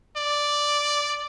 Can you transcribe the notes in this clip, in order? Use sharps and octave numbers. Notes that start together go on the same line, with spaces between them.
D5